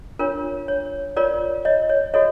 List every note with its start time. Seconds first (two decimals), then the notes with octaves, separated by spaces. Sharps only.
0.19 D4 F4 A#4 C#5
0.68 C#5
1.17 F4 A#4 C#5 D5
1.65 C#5 D#5
1.89 C#5
2.14 F#4 A4 C#5 D#5